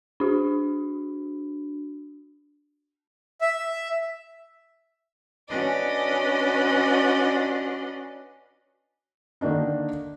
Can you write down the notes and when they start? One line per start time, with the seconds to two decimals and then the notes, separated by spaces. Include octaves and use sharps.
0.20 D4 F#4
3.41 E5
5.49 C#4 D4 F#4 B4 D5 D#5
9.41 D3 D#3 A#3 D4 D#4